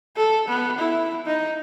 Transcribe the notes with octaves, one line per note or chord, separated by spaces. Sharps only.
A4
B3
E4
D#4